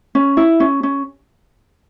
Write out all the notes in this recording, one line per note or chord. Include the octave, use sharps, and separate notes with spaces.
C#4
E4
C#4
C#4